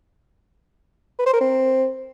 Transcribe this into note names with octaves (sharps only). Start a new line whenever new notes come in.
B4
C5
A#4
C4